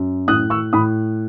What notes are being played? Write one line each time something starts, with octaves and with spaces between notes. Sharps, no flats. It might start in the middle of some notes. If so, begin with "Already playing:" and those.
Already playing: F#2
A2 D#6 F#6
C#6 E6
A2 B5 D#6